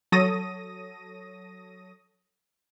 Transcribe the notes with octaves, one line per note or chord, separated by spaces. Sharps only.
F#3 A4 C#5 D#6 A#6 D#7